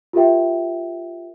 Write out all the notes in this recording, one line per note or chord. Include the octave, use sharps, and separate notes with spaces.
F4 G4 A#4 E5 G5